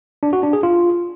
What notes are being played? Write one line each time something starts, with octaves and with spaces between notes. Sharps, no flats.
D4
F#4
D4
G#4
F4